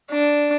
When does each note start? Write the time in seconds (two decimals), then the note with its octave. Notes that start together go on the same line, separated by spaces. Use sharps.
0.12 D4